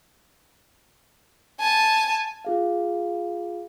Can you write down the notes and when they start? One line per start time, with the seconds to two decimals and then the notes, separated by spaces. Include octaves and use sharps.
1.60 G#5 A5
2.45 F4 G#4 F5